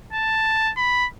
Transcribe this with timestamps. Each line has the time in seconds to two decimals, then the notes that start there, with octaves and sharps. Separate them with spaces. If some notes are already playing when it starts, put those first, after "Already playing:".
0.13 A5
0.77 B5